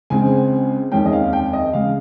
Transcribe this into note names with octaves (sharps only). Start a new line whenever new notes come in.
C#2 C#3 G#3 C4 G#5
F1 D#2 D#3 G#3 C#4 G5
D#5
F5
G5
D#5
C#3 G#3 F5